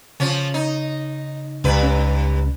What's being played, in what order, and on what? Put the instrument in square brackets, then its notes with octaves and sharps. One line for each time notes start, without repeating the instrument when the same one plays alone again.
[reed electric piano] C#3 [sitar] F3 C#4
[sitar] D#4
[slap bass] C#2 [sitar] G2 B4
[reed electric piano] C#4